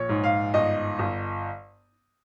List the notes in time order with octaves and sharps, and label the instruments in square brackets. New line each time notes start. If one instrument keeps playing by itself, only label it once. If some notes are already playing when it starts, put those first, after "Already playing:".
Already playing: [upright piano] A#1 C#5
G#2
F5
G1 D#5
G1